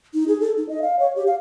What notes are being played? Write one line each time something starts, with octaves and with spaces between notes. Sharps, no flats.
D#4
G#4
A4
D#4
D#5
F5
C#5
G4
F5